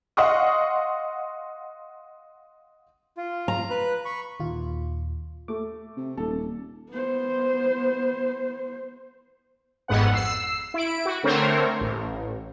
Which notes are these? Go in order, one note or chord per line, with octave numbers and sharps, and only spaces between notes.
D#5 F5 F#5 C6 C#6 D#6
F4
A#5
B4 F#6
B5 C#6
D#2 A#2 F4
A3 D6
C3
D#1 A4
B3 C5
G#1 F2 G#2 B3 F#5
E6 C7
E4 D7
F#4
D3 A3 C4 A#4 C5 C#5
A1